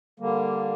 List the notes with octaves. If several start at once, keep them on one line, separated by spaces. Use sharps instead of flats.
D3 G3 A#3